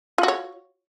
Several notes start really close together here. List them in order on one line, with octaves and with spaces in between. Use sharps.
F4 F#4 C#5